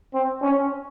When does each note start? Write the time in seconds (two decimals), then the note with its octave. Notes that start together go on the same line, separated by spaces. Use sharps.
0.14 C4
0.42 C#4